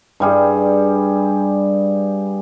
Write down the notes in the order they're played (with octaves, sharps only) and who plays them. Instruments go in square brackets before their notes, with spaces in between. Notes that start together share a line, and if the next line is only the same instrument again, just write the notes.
[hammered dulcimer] G2 G3 G#4